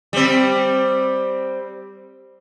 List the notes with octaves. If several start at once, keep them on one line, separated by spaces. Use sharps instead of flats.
G3 C4